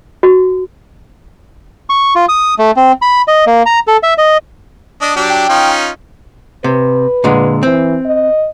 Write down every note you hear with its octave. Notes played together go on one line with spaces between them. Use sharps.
F#4
C#6
F4
D#6
A3
C4
B5
D#5
A#3
A#5
A4
E5
D#5
D4 D#5
F#3 D4 G4
G5
C#4 D#4 F4
C3 B4
A#2 D3 G#3
E3 C4
D#5